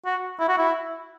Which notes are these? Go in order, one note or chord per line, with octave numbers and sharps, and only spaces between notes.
F#4
E4
F#4
E4